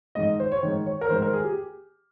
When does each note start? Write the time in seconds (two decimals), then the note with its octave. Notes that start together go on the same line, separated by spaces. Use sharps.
0.15 G#2 D#3 D#5
0.40 C5
0.52 C#5
0.63 G#2 D#3
0.86 C#5
1.01 A#4
1.09 G#2 D#3 C5
1.22 A#4
1.33 G#4
1.44 G4